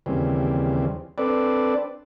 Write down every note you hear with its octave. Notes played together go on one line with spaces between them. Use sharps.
D#2 C#3 E3 G3 C4
C4 D4 A4 B4 D5